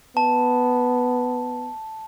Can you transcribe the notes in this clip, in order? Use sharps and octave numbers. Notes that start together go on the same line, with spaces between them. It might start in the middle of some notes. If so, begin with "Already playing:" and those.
B3 A5